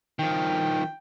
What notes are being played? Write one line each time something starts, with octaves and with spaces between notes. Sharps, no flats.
D#3 F3 G5